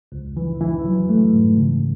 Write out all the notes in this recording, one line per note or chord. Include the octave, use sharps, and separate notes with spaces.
C#2
E3
E3
F#3
A3
G#2
C#3